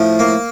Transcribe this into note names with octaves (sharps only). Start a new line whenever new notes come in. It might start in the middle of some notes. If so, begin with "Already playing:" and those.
Already playing: A2 F3
A#3